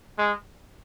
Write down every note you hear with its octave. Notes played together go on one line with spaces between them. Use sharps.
G#3